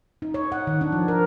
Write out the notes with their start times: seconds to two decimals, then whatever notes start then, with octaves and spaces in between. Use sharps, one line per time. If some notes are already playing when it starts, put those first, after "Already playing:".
0.22 D#4
0.34 C#5
0.52 F#5
0.67 D#3
0.81 D4
0.92 F3
1.08 A#4